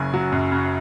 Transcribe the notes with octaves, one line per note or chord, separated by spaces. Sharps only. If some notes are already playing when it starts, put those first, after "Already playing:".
Already playing: F#1 C#3 G#5
F#3
F#2
C#3